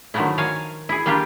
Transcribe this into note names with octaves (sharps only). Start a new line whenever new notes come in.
D3 D#3 F3 F#3 A3 E4
A#4 C#5 F5 G#5
E4 G#4
G3 A#3 D4 F4 G4